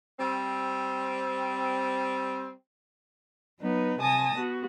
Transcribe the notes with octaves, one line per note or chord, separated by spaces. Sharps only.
G3 C4
F#3 B3 D#4 B4
C3 G#5 A5 D#6 A#6
B3 F#4